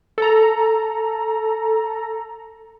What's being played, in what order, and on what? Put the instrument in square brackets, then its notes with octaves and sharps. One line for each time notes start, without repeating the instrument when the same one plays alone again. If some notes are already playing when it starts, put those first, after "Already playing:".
[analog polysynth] A4 A#5